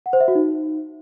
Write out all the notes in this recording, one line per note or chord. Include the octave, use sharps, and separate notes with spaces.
F#5
C5
E5
F#4
D#4